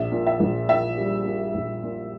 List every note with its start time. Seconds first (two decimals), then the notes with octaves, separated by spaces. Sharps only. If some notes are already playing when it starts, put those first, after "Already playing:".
Already playing: A#1 E5
0.12 A#2
0.27 E5
0.40 A#1
0.68 A#2 E5
0.97 G3
1.26 A#2
1.54 A#1
1.83 A#2